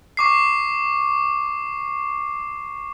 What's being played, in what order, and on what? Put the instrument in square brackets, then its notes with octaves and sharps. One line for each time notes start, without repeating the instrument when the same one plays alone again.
[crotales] C#6 D6 C7